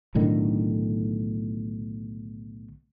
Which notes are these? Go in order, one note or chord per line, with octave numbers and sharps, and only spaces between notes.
B1 A2 D3 D#3